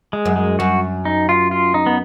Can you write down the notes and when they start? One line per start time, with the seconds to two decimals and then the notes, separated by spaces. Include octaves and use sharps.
0.13 G#3
0.25 F#2
0.36 G#3
0.59 F#2 F#4
1.05 D#4
1.29 F4
1.51 F4
1.74 D#4
1.86 B3